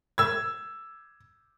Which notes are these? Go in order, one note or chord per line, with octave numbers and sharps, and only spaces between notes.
E6 G#6